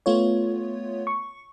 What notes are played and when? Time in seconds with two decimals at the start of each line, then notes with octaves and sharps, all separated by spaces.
0.06 A3 B3 F4 C#5
1.07 C#6